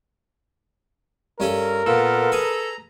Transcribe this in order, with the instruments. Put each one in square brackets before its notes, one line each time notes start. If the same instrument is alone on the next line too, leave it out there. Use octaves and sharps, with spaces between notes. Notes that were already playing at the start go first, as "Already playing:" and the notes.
[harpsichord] G2 C#4 A4 [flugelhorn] A#4
[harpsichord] A#2 [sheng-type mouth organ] B3 F4 B4 [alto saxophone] A4
[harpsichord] G#4 B4 [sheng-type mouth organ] A#5